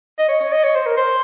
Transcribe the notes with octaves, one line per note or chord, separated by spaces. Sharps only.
D#5
C#5
C#5
D#5
C#5
C5
A#4
C5